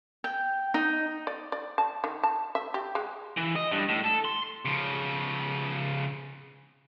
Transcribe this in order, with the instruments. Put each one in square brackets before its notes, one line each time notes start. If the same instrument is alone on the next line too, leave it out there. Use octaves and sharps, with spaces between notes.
[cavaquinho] G5
D#4
[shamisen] D5
D5
A5
D#3
A5
E5
G4
G#3
[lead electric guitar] E3
D#5
G2
A2
A4
C6
[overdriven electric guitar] C#3 F3